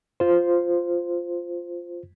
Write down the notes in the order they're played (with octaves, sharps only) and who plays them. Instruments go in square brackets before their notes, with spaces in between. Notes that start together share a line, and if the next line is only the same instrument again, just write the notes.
[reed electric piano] F4 C5